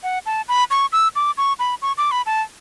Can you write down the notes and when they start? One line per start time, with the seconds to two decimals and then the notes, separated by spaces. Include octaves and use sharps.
0.03 F#5
0.26 A5
0.48 B5
0.71 C#6
0.92 E6
1.16 D6
1.37 C#6
1.59 B5
1.82 C#6
1.98 D6
2.11 B5
2.26 A5